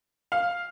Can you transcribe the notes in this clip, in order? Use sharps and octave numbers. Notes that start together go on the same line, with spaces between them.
F5